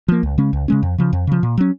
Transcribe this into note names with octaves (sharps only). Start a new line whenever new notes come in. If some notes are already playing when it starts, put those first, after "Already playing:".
F3 A#3
C#2
C#3 G#3 C#4
C#2
C#3 G#3 C#4
F2
C#3 F3
F2
C#3 F3
A#2
F#3 C#4